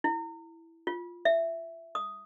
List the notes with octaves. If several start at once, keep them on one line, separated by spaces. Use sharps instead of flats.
E4
F4
E5
D#6